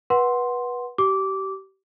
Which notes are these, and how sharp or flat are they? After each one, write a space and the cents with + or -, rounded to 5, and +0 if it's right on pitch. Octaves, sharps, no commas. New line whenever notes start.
B4 -20 F#5 +0 C6 +0
G4 -30 D6 -15